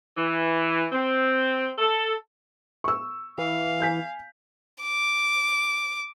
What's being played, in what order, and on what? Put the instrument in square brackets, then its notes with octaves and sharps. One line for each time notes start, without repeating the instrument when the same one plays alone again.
[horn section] E3
C4
A4
[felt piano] C#6 E6
[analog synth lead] E3 [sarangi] F5
[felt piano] G#5 G6 B6
[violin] D6